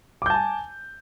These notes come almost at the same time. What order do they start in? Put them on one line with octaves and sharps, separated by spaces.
D6 G6 A5 G#5